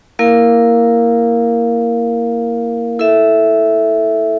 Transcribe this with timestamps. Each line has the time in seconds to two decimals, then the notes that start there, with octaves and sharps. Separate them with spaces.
0.19 A#3 E4 A#4 F5
2.99 E4 A4 E5